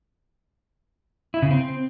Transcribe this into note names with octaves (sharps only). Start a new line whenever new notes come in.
E4
C#3
C4